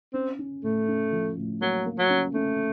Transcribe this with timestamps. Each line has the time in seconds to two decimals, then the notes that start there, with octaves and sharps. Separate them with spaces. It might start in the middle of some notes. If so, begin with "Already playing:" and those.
0.14 C4 C#4
0.39 C#4
0.63 A2 A3
0.88 C#4
1.12 F3
1.37 A2
1.61 F#3 A#3
1.86 A#3
1.99 F#3
2.10 C#4
2.34 A3 C#4